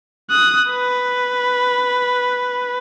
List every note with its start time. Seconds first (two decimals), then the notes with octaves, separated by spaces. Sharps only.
0.30 D#6 F#6
0.72 B4